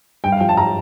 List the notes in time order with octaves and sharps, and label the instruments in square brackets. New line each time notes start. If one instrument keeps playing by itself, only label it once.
[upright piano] G2 G5
F5
F3 G5
A5
A#5